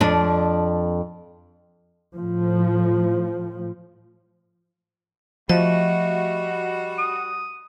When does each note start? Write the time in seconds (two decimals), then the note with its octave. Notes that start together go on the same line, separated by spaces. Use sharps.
0.01 F2 D4
2.14 A2 F3
5.49 F3 G3 A3 F#4 D#5
6.98 D#6